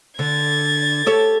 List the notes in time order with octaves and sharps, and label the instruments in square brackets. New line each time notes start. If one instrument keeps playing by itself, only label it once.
[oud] D3 [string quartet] G#6 A6
[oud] G4 A4 C#5